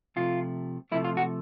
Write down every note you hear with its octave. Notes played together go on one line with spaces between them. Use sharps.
C3 F3 A3 F4
C3 F3 A3 E4
F4
F#4